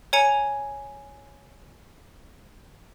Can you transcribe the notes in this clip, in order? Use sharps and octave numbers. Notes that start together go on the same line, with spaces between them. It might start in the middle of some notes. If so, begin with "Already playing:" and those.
C#5 G#5 A#5 C#7 F7